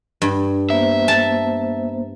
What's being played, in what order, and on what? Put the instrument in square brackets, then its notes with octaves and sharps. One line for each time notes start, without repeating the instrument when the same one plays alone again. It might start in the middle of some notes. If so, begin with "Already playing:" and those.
[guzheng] G2
[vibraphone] A#3 B3 C5 [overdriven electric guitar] E5
[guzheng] A5